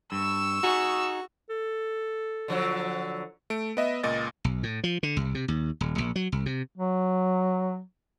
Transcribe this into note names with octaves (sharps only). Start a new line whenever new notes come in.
G2 C#6 E6
D#4 F#4 G#4
A4
D3 F3 F#3
A3 D7
B3 D#5 E5
C#2 A#2 D#5 A6
B1
A2
F3
D3
C2
C3
D#2
D#1
A#1
F#3
C2
C3
F#3